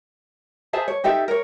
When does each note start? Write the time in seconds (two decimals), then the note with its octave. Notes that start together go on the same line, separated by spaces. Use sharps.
0.73 G#4 C5 E5 A5
0.88 C#5
1.04 D#4 G4 A4 E5
1.28 A#4 C#5